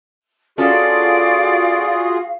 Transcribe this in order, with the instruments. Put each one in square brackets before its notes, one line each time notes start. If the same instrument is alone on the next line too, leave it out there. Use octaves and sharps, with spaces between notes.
[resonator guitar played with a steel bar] C#4 A4 [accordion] F4 F#4 G#4 [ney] D5 [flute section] F5